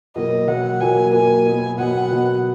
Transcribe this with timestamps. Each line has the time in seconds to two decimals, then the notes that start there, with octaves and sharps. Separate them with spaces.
0.15 B2 F#3 A#3 D#5
0.48 B2 F#3 A#3 F#5
0.80 B2 F#3 A#3 G#5
1.12 B2 F#3 A#3 G#5
1.46 B2 F#3 B3
1.77 B2 F#3 B3 F#5
2.11 B2 F#3 B3